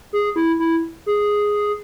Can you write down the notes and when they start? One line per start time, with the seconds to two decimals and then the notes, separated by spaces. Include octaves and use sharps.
0.13 G#4
0.36 E4
0.59 E4
1.06 G#4